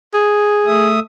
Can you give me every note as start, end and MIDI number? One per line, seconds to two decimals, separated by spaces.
0.13 0.91 68
0.66 1.00 57
0.66 1.00 76
0.66 1.00 87